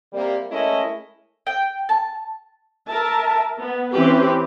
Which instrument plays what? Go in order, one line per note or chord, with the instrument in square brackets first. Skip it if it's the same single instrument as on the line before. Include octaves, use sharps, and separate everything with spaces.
[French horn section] C3 G3 A#3
G#3 A3 C#4 E4 A#4 D#5
[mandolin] G5
A5
[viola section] A#4 E5 A5
B3
E3 C4 C#4 G4 B4